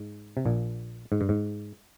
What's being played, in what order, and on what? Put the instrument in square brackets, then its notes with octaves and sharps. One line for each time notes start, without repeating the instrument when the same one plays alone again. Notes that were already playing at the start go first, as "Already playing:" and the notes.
Already playing: [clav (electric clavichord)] G#2
C3
A#1 A#2
G#2
G2
G#2